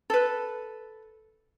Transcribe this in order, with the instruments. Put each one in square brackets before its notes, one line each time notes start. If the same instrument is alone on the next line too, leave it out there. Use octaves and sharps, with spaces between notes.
[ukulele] A4 B4